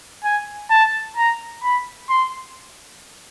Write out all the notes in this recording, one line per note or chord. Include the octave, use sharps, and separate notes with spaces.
G#5
A5
A#5
B5
C6